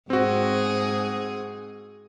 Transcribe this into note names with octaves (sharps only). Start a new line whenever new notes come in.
G#2 C4 F#4 G#4